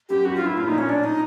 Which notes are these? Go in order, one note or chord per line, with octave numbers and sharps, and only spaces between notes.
F#2 G4
F#2 F#4
F4
G2
E4
A2 F4
A#2 D#4
A#2 C#4
D4
D#4